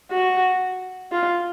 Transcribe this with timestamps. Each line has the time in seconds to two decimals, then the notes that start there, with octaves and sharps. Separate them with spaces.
0.11 F#4
1.12 F4